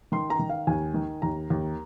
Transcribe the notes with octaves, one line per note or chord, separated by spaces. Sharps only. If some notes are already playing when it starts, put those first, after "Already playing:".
D#3 C6
A#5
D#3
F5
D#2 G#5
D#3
D#2 A#5
D#2